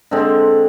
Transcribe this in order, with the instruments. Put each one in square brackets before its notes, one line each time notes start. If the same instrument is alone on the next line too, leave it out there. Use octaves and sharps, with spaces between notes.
[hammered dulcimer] D3 G#3 C4